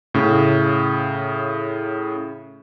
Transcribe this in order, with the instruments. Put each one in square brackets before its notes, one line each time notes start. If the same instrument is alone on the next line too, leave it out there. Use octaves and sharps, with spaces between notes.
[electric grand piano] A2 C#3